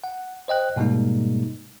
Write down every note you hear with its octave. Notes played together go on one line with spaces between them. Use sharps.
F#5
C5 D#5 G5 F#6
G#2 B2 G3 G#3 A#3 D#4